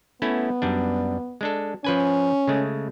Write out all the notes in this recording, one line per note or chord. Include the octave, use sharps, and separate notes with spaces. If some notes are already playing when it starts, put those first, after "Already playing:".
A3 B3 C#4 E4
F#2 G3 D4
G#3 D4 A4
F3 C#4 B4 G#5
C#3 G#3 A3